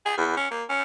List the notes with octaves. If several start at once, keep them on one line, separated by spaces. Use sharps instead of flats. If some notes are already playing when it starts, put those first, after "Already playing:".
G#4
E2
C#4
A#3
C#4